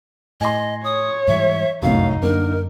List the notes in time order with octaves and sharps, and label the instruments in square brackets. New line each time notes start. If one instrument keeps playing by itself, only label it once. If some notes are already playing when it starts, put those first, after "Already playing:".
[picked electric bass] A2 [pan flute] D#5 [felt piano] G#5 C6
[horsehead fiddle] C#5 [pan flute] D#6
[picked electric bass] G#2 E3 G3 [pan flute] E5
[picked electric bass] F1 C2 [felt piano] F#2 A2 [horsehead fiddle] D#4 [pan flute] F5
[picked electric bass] F#2 [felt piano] D3 A#3 [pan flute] A#4